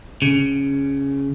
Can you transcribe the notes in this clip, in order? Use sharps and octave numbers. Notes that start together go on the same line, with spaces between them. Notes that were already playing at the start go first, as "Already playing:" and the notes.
C#3